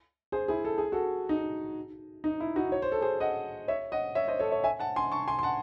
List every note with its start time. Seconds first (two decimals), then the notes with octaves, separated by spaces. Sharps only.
0.32 G#4 C5
0.48 E4 G#4
0.65 A4
0.78 G#4
0.92 F#4 A4
1.29 D#4
2.24 D#4
2.40 E4
2.56 D#4 F#4
2.72 C#5
2.82 C5
2.92 A4
3.01 G#4 C5
3.20 D#5 F#5
3.68 C#5 E5
3.92 D#5 F#5
4.15 C#5 E5
4.28 C5 D#5
4.39 A4 C#5
4.51 C#5 E5
4.64 E5 G#5
4.79 F#5 A5
4.96 G#5 C6
5.12 A5 C#6
5.27 G#5 C6
5.39 C6
5.43 F#5 A5